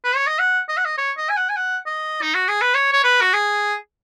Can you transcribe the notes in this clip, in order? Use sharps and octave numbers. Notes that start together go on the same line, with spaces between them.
B4
C#5
D#5
F#5
D#5
F#5
D#5
C#5
D#5
G#5
F#5
G#5
F#5
D#5
D#4
F#4
G#4
B4
C#5
C#5
B4
F#4
G#4